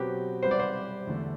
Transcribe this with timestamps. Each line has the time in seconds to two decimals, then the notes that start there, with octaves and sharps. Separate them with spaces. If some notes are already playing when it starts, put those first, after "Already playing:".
Already playing: B2 F#3 C4 F#4 G4 B4
0.43 G3 C4 G4 B4 C5
0.51 D5
0.59 C5
1.07 E2 D3 A3 D4